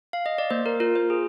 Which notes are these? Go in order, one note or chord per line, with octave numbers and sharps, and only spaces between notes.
F5
D#5
D5
A#3 C5
A#4
F4 A#4
C5
G#4